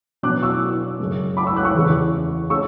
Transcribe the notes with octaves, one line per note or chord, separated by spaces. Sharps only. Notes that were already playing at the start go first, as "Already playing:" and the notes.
B2 F#3 B3 D4 D6 F#6
C#6 E6
F#2 C#3 G#3
B5 D6
C#6 E6
D6 F#6
C#6 E6
E2 C#3 E3
G#3 C#4 C#6 E6